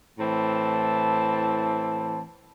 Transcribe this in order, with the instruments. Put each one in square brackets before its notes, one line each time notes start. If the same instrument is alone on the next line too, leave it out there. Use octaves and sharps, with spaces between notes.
[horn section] A2 E3 C4 A5